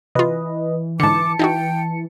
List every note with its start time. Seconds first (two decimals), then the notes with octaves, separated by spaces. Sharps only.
0.15 C3 E3 F4 B4 D#5
1.00 G#2 D3 A5 D6 C#7
1.39 E3 D#4 E4 F#4 G5